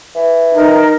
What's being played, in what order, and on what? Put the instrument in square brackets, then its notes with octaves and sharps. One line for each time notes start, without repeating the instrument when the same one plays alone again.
[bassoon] E3
[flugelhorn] D#4 [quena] A#4